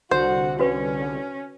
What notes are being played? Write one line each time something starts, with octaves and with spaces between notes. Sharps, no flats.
C2 D3 F#4 C5
C#4 F#4 B4